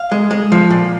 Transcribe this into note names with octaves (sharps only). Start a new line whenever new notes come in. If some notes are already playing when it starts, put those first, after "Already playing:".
Already playing: F5
G#3
G#3
F3
A#2